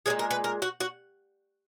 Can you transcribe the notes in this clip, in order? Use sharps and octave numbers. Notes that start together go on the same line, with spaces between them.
A#2 F3 G#3 G#4
A#4
B4
A#4
F#4
F#4